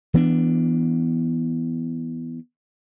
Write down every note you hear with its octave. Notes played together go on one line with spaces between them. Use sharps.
E3 B3 D4